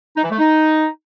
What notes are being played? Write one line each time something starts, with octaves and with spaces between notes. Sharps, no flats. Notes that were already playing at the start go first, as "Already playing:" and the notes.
D#4
E3
A3
D#4